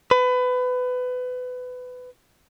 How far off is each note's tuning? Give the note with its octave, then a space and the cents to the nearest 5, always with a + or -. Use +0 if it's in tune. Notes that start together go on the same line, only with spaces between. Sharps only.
B4 +25